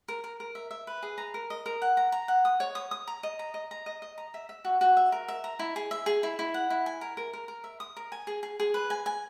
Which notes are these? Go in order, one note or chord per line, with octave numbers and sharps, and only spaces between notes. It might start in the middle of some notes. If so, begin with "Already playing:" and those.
A#4
A#4
A#4
E5
E5
B4
G#4
A#5
A#4
D#5
A#4
F#5
A#5
A#5
F#5
D#6
C#5
D#6
D#6
A#5
D#5
A#5
D#5
A#5
D#5
D#5
A#5
E5
E5
F#4
F#4
E5
A#4
E5
A#5
E4
G#4
E5
G#4
E4
E4
F#5
E4
G#5
A#4
A#4
A#4
A#4
E5
D#6
A#4
G#5
G#4
G#4
G#4
B4
G#5
G#5